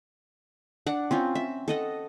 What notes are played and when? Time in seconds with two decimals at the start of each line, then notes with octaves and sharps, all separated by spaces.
0.87 D4 F#5
1.11 C4 C#4 F4
1.35 E5
1.68 A4 D#5 F#5